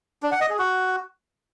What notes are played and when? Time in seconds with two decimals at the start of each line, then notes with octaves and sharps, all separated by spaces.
0.23 D4
0.32 F#5
0.41 D#5
0.50 G#4
0.59 F#4